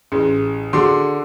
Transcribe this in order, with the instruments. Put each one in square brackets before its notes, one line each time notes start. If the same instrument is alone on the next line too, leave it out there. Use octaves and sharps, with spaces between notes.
[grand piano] A1 [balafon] C#4 G#4
[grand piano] D3 C6 D6 [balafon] D4 F#4 G#4